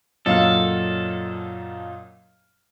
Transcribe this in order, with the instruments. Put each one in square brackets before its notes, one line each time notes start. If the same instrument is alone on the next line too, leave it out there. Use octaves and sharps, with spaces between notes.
[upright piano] F#2 A#2 F#3 [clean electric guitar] A4 [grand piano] D#5 F5 F6